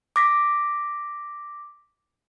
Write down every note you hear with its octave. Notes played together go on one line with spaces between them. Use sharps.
D6 A#6 B6